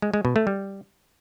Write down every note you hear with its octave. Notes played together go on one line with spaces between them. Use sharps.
G#3
G#3
B2
A3
G3